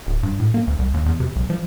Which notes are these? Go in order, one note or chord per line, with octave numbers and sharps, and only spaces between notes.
D1
G2
A2
A#3
D2
C2
D#2
E2
C3
B1
F3